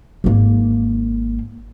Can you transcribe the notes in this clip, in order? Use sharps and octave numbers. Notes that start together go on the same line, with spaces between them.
G#1 A#3